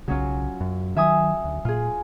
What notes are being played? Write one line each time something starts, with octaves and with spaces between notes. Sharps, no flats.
B1 C#3 F#3 C#4 F4
F#2
D#3 F#3 E5 G#5 D#6
D2
A#2 F4 G#4